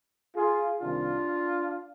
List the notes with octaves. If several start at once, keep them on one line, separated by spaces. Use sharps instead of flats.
F4 G#4
C2 C3 D#3 D4 F4